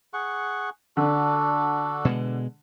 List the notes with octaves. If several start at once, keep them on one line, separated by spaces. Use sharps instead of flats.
G#4 F#5 C#6
D3 D4 F#4 A4
B2 G#3